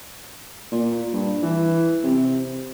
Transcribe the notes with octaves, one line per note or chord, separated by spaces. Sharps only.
A#2
G2
E3
C3